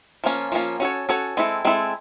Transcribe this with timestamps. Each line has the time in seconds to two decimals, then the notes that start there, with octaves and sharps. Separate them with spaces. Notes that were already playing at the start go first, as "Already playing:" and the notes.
0.24 F3 A#3 C#4 F4
0.52 F3 A#3 C#4 F4
0.80 C#4 F#4 A4 C#5
1.09 C#4 F#4 A4 C#5
1.37 G#3 C4 E4 A4
1.65 G#3 C4 E4 A4